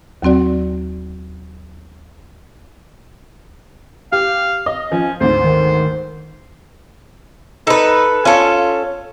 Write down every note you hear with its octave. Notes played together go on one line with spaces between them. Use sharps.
D#2 F#3 C4 F#4 D5
G4 F5
D#5
F3 C#4
D2 G#2 C5
D#3
D#4 A4 B4
C#4 F4 A4